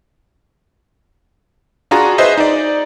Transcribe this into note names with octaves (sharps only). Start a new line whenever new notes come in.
D4 F4 F#4 G#4 A#5
G#4 B4 C5 D#5 E5
D#4 D5